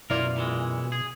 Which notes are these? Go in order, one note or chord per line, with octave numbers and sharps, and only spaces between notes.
F#2 B2 A#3 E4 F4 A#4 D5
A#2 E3 G#3
G#4